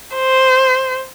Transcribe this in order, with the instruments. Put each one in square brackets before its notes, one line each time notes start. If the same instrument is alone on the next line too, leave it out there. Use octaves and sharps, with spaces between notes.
[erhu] C5